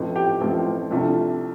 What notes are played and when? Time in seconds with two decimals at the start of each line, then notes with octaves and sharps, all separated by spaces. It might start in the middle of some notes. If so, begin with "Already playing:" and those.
Already playing: A1 A2 F3 A3 C4
0.16 G4
0.40 A1 A2 F3 A3 C4 F4
0.91 C2 C3 F3 A3 D4 F4